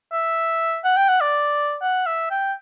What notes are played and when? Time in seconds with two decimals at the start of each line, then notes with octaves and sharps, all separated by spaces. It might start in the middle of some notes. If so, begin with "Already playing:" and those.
0.12 E5
0.85 F#5
0.97 G5
1.09 F#5
1.21 D5
1.82 F#5
2.06 E5
2.31 G5